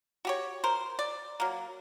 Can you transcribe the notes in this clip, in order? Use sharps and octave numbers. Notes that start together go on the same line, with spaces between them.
F#4 G4 C#5
A#4 C5
D5
F#3 A#3